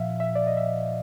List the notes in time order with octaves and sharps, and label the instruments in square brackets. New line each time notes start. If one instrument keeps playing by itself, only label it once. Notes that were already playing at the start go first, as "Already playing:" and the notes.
Already playing: [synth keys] A#2 F3 E5 F5
E5
D5
D#5
E5